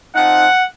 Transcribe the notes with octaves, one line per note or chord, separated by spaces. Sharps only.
F3 C4 D#4 F#5